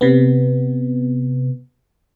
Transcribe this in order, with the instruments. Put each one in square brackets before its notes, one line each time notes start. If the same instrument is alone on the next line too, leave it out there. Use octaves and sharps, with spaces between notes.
[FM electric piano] C3 B3